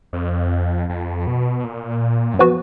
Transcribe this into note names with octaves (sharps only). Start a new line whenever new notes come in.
F2
F2
B2
A#2
F#2
F3 B3 F#4 B4